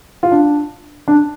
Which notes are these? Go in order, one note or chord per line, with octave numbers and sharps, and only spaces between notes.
F4
D4
D4